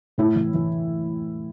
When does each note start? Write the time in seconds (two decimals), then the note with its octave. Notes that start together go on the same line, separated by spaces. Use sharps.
0.18 A2 E4
0.36 E3
0.54 E3